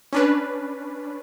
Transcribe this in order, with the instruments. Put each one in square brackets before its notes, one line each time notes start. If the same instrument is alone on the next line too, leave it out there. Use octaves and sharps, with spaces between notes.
[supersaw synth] C#4 D4 B4